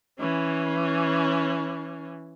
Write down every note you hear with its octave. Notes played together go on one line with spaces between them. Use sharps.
E3 C#4